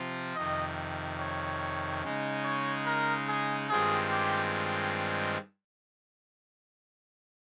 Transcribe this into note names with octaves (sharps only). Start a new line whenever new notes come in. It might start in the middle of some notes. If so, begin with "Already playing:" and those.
Already playing: C3 F3 C4 F4
F2 C3 D#3 D#5
C#5
C#3 G#3 D#4
C#5
A#4
G#4
G2 D#3 G#3 C4 F4 G#4
G4